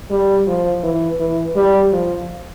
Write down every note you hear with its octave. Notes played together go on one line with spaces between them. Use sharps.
G3
F3
E3
E3
G3
F3